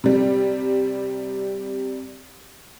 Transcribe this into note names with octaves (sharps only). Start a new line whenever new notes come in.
C3 G3